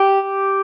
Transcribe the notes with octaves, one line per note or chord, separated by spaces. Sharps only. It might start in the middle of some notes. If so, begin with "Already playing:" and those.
Already playing: G4